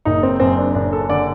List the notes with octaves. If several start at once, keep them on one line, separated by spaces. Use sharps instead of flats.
F#1 D#4
C4
F#2 C4
D4
F#1 D4
A4
D3 D5